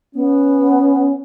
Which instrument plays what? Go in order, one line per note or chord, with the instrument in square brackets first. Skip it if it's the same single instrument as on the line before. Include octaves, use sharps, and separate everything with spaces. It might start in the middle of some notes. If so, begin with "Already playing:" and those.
[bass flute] B3 [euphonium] C#4